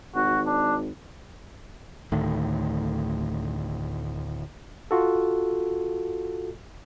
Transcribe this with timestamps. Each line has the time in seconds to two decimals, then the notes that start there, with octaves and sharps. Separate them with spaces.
0.15 G#1 F#4
0.46 D4
2.12 D2 A2 D#3
4.91 F4 F#4 A4